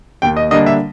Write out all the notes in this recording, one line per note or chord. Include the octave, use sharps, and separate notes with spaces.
D#2 G5
D#5
D3 G3 A#3 D4 D#5
E5